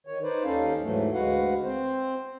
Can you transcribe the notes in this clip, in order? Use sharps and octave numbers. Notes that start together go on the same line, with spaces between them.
D#3 C#5
D#4 B4 C5 D5
D#2 C#4 D#4 A4 F5
G#2 E3 F#3 A3
D2 G#3 F#4 B4 F5 F#5
C4 C5